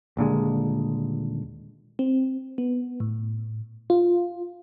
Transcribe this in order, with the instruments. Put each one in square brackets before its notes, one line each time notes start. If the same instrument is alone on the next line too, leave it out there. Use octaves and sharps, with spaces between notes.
[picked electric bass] D#1 A#2 D3 G#3
[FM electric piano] C4
B3
A2
F4